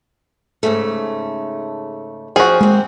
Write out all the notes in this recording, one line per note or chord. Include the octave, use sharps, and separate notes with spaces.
G#2 C#3 A3
F3 C4 F#4 G#4
G#3 A#3 C4